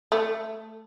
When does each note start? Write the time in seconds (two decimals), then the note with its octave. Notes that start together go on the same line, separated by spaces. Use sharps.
0.12 A3